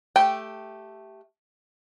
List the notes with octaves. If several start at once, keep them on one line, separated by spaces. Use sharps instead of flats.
A3 G4 G5